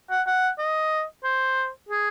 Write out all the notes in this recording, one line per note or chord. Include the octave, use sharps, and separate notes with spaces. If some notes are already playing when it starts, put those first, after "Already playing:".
F#5
F#5
D#5
C5
G#4